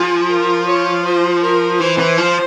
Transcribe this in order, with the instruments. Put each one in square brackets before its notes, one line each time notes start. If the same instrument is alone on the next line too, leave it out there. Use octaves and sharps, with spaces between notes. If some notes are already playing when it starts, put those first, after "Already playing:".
Already playing: [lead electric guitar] F3 [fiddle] G#4
[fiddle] A#4
C#5
C5
A#4
[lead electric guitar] E3 [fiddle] C5
[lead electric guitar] E3
F3